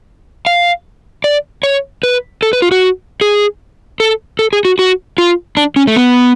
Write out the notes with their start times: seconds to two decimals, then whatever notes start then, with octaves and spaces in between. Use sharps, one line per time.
0.47 F5
1.24 D5
1.63 C#5
2.03 B4
2.43 A4
2.53 B4
2.62 F4
2.71 F#4
3.21 G#4
4.00 A4
4.39 A4
4.53 G#4
4.65 F#4
4.79 F#4
5.18 F4
5.57 D4
5.76 C#4
5.87 A3
5.96 B3